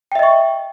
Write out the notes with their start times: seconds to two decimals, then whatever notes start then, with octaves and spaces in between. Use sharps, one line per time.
0.12 G5
0.15 E5
0.19 D#5
0.23 C#6